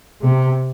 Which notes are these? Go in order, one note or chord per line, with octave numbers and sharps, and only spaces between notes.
C3